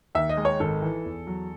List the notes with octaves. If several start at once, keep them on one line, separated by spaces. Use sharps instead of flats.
D#2 E5
D#5
G#3
C#5
G#1 A4
E3
E2
F#3